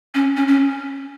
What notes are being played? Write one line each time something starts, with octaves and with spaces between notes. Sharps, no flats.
C#4
C#4
C#4